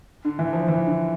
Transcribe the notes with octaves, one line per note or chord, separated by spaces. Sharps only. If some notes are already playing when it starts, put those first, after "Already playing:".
D3
E3
F3
E3
D3